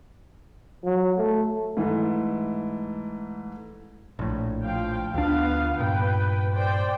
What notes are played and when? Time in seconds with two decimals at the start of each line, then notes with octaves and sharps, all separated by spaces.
0.84 F#3
1.18 A3
1.77 G#2 E3 A3
4.19 A#1 A2
4.62 F3 F5 G5
5.14 D2 B3 D4 F4 F5
5.80 G2 A#2 B4 G5
6.55 C5 D5 G5